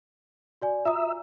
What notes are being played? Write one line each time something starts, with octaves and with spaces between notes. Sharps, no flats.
F#4 D5 G#5
F4 E5 A#5 D#6